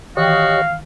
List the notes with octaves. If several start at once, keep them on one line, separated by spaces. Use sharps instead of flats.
D#3 E3 F#4 G4 C#5 D#5 F5 G5